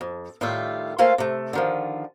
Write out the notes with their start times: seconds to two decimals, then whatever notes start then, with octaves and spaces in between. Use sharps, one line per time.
0.01 F2
0.41 A2 D#3 G3 F4 G4 E5
0.98 A3 A#3 F4 C5 F5 G#5
1.18 C3 A3
1.53 D3 D#3 F3